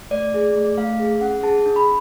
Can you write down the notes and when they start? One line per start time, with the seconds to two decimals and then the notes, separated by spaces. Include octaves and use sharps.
0.11 A3 D5
0.34 G#4
0.56 A3
0.77 A3 F5
1.00 G#4
1.21 C#4 F#5
1.43 G#4 A5
1.66 D4
1.76 B5